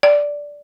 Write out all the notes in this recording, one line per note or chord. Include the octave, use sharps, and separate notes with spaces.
D5